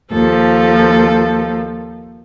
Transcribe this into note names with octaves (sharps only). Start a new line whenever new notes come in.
D#2 F3 A4